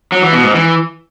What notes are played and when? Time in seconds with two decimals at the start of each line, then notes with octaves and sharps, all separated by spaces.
0.12 F#3
0.22 E3
0.33 B2
0.43 G#2
0.54 E3